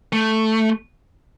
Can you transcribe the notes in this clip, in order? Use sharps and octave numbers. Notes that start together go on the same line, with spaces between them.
A3